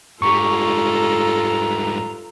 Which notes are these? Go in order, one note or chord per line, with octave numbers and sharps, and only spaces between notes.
G#2 G3 F4 A4 A#5 C#6